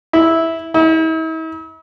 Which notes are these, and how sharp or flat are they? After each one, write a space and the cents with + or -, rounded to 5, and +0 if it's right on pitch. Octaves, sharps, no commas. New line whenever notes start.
E4 -10
E4 -45